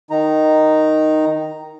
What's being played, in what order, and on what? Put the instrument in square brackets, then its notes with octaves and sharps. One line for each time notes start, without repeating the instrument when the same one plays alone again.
[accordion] D#3 D#4 A#5